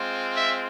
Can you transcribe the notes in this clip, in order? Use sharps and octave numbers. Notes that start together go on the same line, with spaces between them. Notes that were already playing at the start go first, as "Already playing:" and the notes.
Already playing: G#3 C4 F4
E5